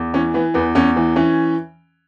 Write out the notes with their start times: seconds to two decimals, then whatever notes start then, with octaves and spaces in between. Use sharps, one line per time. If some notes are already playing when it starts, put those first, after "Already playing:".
Already playing: E2
0.14 E3 C#4
0.34 E3 B3
0.54 E2 B3
0.75 E2 C#4
0.96 E3
1.16 E3 C#4